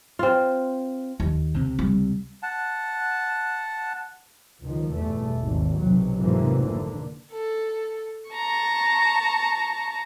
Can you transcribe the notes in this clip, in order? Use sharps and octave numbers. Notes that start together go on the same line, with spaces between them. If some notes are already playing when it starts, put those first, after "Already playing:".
C4 F4
D#2
C#2 C3 C4
G3
F#5 A5
C#2 D#3 F3
G1 E2 B2 A3
G#1 D#2
B1 C3 F#3
F1 G#2 C3 E3 F3 A#3
D3 A#3
A4
A5 A#5 C#6